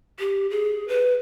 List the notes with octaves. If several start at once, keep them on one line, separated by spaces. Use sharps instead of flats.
G4
G#4
B4